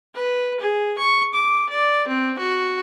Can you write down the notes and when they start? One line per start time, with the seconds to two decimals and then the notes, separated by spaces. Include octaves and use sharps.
0.15 B4
0.60 G#4
0.98 C#6
1.34 D6
1.70 D5
2.07 C4
2.39 F#4